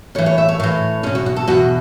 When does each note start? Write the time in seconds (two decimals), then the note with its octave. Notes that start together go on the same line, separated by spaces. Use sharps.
0.15 A2 C#5
0.18 E3
0.26 C#5
0.38 E5
0.49 C#5
0.60 A2 E3 C#5
1.03 E2 B2 C#4
1.15 F#4
1.26 F#4
1.36 A4
1.48 E2 B2 F#4